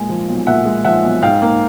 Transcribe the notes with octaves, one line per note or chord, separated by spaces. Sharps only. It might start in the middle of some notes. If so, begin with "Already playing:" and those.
Already playing: A#2 G#3 G#5
F3
B1
A#2 E5 F#5
G#3
F3 E5 F#5
B1
G#2 F5 G5
A#3